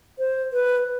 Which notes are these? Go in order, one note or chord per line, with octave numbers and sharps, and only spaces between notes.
C5
B4